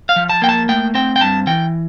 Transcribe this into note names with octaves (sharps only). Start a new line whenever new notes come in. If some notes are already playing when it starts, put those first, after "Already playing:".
F5
F3
A5
A#3 G5
A5
A3 G5
C4 G5
G5
G2 A5
E3 G5